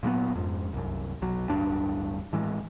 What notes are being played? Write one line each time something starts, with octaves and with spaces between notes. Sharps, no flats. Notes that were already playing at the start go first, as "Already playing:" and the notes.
A#2 F#3 A#3 B3
F2 G#2
C2 F#2
B1 F#3
D1 A1 G2 D4
A2 E3 G#3